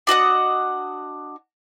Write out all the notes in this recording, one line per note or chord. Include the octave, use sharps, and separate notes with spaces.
D4 F#4 D#5 F#5